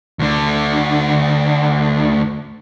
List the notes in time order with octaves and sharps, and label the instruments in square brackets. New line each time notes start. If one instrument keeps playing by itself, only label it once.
[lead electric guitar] D2 D3